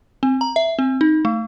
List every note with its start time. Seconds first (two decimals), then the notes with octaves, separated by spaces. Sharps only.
0.23 C4
0.41 A#5
0.56 E5
0.79 C4
1.01 D#4
1.25 A3